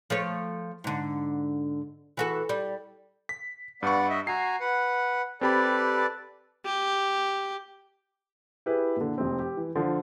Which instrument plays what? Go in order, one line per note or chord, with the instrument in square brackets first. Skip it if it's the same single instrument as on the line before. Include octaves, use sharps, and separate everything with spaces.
[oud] F3 A3 C#5
G#2 D3
E3 F#4 A4
G3
[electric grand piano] B6
[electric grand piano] G2 C#6 [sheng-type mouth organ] B3 D5 F#5
[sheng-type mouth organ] D#5 E5
[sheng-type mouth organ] F#4 G#5 A#5 [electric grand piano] C7
[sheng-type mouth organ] B4 F#5
[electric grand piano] C4 G4 B5 [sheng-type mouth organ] A4 B4 D5
[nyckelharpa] G4
[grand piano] E4 G4 G#4 B4
A#2 D3
F1 C4
G4
E3
D3 F3